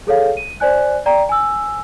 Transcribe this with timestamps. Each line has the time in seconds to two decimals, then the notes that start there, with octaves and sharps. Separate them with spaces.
0.07 G#4 A4 C#5 F5
0.37 D#7
0.60 C5 D5 G#5 F#6
1.06 D5 G5 A#5
1.29 G#5 E6